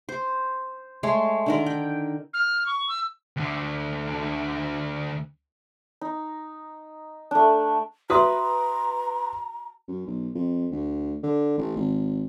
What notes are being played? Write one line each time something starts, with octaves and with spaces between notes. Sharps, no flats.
C5
G#3 A3 C#5 C6
D3 D#3 A#4
G5
F6
C#6
E6
D2 D3
D#4
A3 D4
F#4 B4 E5 A#5 C6 D#6
F#2
B1
F2
D2
D3
A1
G#1